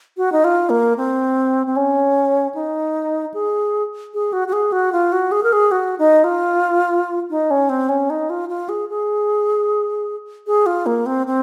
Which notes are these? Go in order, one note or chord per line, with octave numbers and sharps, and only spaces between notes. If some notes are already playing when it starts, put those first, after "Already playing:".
F#4
D#4
F4
A#3
C4
C4
C#4
D#4
G#4
G#4
F#4
F#4
G#4
F#4
F4
F#4
G#4
A#4
G#4
F#4
D#4
F4
D#4
C#4
C4
C#4
D#4
F4
F4
G#4
G#4
G#4
F4
A#3
C4
C4